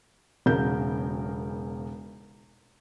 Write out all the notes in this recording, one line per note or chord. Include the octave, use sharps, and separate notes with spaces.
E1 B1 C#3 A#4 G6